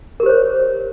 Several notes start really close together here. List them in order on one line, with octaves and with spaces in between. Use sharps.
A#4 G4 C5 C#5